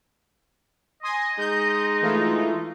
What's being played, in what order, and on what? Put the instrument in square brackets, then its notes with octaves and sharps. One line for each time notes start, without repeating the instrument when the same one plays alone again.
[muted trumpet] D#5 [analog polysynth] G#5 C6 D#6
[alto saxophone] G#3 [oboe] D#4 [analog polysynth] G6
[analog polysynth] E3 A3 F4